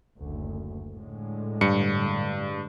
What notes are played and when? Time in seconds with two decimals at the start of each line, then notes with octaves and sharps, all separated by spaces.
0.19 F#1 D2
0.93 A2 D3 G#3
1.61 G2 C#7